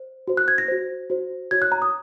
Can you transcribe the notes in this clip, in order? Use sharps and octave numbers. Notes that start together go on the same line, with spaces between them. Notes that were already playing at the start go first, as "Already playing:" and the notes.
Already playing: C5
F#4 C5
F#6
G#6
A#6
F#4 C5
F#4 C5
F#4 C#5 G#6
F#6
A#5
D#6